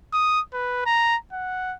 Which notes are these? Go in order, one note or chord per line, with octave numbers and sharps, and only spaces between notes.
D#6
B4
A#5
F#5